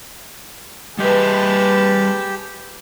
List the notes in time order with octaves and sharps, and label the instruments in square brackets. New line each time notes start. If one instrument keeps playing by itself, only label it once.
[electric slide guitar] G3 D#5 E5 [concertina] G4 [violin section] G#4 B4 A5